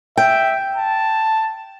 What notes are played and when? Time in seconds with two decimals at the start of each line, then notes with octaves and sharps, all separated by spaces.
0.17 E5 G5
0.76 A5